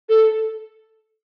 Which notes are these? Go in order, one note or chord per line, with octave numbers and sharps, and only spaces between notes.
A4